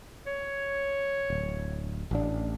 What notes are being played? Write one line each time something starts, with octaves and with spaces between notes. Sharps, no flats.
C#5
D1
A1 D4